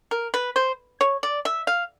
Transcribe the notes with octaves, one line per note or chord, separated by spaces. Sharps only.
A#4
B4
C5
C#5
D5
E5
F5